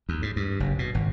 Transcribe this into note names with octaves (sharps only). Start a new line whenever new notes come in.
D#2
G#2
G2
F#1
B2
G#1